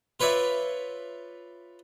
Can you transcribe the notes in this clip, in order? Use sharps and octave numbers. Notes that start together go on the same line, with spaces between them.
F4 B4 C#5 D5 E5